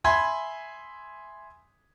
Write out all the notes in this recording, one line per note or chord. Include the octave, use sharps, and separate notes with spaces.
E5 G#5 B5 C6 G#6